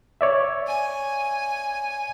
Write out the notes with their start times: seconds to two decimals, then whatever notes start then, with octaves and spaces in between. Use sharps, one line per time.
0.21 C#5 D5 E5
0.67 G#5